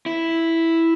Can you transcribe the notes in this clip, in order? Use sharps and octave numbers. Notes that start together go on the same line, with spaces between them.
E4